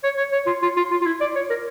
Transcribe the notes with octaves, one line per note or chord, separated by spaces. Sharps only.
C#5
C#5
C#5
F4
F4
F4
F4
F4
E4
D5
C#5
A#4